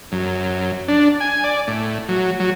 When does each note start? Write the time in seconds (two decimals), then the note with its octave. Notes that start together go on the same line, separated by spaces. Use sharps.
0.12 F#2
0.88 D4
1.20 G#5
1.44 D5
1.68 A2
2.09 F#3
2.40 F#3